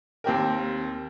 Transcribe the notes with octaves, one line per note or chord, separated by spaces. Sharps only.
D#2 C4 G4 A#4